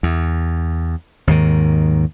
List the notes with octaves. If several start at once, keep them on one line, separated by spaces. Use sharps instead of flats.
E2
D#2 G#2 D#3